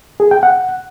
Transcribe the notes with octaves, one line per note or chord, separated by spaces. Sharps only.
G#4
G5
F#5